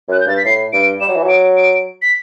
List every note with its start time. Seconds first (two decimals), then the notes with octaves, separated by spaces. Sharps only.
0.08 F#2 F#6
0.20 G6
0.26 G2 A6
0.37 B6
0.45 A2 C7
0.73 G2 D7
1.01 G3 E7
1.08 F#3
1.16 E3
1.23 F#3
1.29 D7
1.57 D7
2.02 B6